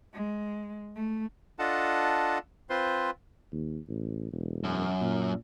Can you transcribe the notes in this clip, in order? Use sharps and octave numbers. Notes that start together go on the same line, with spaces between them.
G#3
A3
D4 F4 A4 D#5 F#5 A5
C4 F4 B4 C5 C6
D#2
A1
E1
F#2
A#2